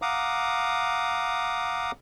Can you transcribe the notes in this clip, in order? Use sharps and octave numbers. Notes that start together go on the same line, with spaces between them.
F5 F#5 A#5 D6 D#6